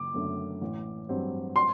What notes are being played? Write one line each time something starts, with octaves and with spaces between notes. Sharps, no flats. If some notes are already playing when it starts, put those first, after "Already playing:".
Already playing: F#1 D6
F#2 D3 A3
A1
G2 F#3 C4
C6